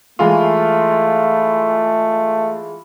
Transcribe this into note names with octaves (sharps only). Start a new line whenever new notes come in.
E3 G#3 A3 F4